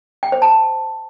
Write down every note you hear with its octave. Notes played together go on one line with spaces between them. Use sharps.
G5
C5
A5